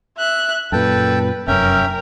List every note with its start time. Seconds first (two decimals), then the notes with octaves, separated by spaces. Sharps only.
0.18 E5 F#6
0.72 F#2 A#2 A4 B4 G5 A5
1.48 F1 F#2 C#4 A#4 E5 G5